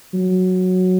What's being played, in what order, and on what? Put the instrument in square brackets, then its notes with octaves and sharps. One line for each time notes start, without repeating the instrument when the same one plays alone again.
[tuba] F#3